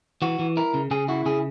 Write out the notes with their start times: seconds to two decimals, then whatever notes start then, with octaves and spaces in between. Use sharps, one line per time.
0.22 E3 F#4
0.39 E3
0.57 E4 A#4
0.74 C#3
0.91 C#3 G#4
1.08 E4 F#4
1.26 C#3 G#4